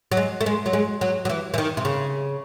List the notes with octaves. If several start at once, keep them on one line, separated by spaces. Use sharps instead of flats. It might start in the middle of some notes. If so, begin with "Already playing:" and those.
F#3
G#3
A3
G#3
F#3
G#3
F#3
F#3
E3
E3
D#3
C3
C#3